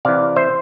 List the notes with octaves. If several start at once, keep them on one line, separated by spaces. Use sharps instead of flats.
C3 E3 D5 F5
C5 E5